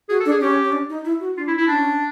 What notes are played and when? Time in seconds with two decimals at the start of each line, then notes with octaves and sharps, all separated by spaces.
0.09 F#4 G#4
0.20 A4
0.25 D4
0.31 G#4
0.41 C#4 G4
0.63 C#4
0.72 D4
0.89 D#4
1.05 E4
1.20 F#4
1.37 D4 F4
1.47 E4
1.58 E4
1.68 C#4 D4